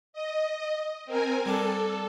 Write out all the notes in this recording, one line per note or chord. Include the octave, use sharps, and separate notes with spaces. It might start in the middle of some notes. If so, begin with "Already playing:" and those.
D#5
C4 A#4 G#5
G3 D4 A4